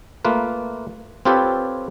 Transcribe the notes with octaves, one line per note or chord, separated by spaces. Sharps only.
A3 A#3 F4 B4
C4 F4 G4 A4 B4 C#5